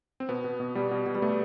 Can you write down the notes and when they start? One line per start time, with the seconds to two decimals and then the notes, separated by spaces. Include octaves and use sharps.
0.20 C4
0.29 B2 B3
0.44 B2
0.60 B2
0.75 B2 G3
0.91 B2
1.06 B2
1.15 G3
1.22 B2 A3